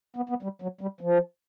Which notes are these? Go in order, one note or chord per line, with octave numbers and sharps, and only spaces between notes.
B3
B3
G3
F#3
G3
F3